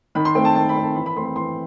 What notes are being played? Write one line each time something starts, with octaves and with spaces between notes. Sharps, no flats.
D#3 B5
C6
A3 C4 G5
A5
D#3 A5
B5
A3 C4
A5
E3 B5
B5
A3 C4 C6
B5
E3 C6